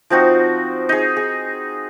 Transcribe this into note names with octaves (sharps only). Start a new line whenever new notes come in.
F3 C4 D#4 F#4
D#4 G#4
G#4